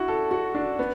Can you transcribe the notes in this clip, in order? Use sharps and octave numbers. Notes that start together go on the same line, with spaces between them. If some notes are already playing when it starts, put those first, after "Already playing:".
Already playing: D4 E4 F#4
A4
F#4
D4
B3